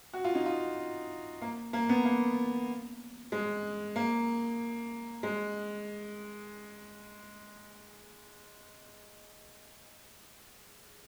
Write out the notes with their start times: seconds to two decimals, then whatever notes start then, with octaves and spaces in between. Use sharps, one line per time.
0.13 F#4
0.24 F4
0.35 D#4
0.46 F4
1.42 A#3
1.73 A#3
1.89 B3
2.05 A#3
3.32 G#3
3.96 A#3
5.23 G#3